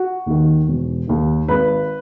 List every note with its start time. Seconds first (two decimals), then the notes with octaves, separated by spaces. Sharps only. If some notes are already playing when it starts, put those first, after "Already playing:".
Already playing: F#4
0.26 D#2 D#3
0.68 E1
1.07 D#2 D#3
1.48 G#1 B4